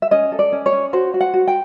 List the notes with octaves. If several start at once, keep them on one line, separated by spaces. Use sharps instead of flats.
E5
C#4 D#5
A4
D5
C#4
C#5
C#4
F#4 C5
F#4
F#5
F#4
G5